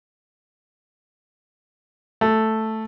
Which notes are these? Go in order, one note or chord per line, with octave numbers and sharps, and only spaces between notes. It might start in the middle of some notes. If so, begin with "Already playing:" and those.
A3